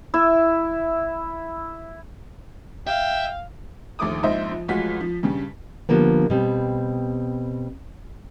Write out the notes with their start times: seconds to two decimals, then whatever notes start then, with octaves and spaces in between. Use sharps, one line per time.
0.14 E4 E5
2.87 E5 F5 G5
3.99 A#1 D#2 A3 D6 D#6
4.23 A#1 F2 G#2 C5 D#5 E5
4.51 F3
4.68 A1 F3 G#3 F4 F#4 B6
5.01 F3
5.23 G2 C#3 G3
5.89 D3 F3 G3 A#3 B3
6.30 B2 G3 C4